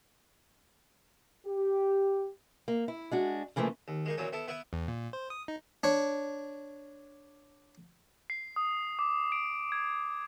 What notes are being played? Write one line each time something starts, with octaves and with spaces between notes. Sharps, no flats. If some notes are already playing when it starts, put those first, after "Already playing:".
G4
A#3
E4
G#3 D4 F#4
C#3 E3 F3 A3 A#3
D#2
G#3 A#3 D#4
E2 A#2 F#3 C#4
B3 E4 A4
B3 E4 B4 F#5
E2
A#2
C5
D#6
D#4
D4 C#5
C7
D#6
D6
D7
G#6